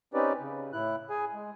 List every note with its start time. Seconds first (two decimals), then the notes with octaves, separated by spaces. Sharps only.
0.14 C4 C#4 D#4 G4 B4 D5
0.40 C#3
0.73 A2 E4 F#6
1.10 G#4 G#5
1.34 G#3